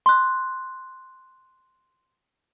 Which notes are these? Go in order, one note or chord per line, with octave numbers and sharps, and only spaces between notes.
C6 F#6